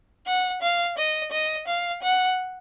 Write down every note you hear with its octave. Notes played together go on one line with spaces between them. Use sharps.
F#5
F5
D#5
D#5
F5
F#5